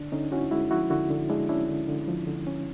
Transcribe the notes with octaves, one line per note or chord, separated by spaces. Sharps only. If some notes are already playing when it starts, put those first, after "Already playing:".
Already playing: D3 D4
D3 C#4 D#4
C#4 E4 F#4
G#3 E4 F#4
F3 E4 F#4
D3 E4 F#4
D3
G#3 D4 E4
C#4 D4 E4
D3
D3
F3
D3
C#4